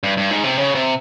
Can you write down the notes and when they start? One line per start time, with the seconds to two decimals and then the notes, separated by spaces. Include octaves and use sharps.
0.03 G2
0.17 G2
0.31 G#2
0.44 C3
0.57 C#3
0.75 C3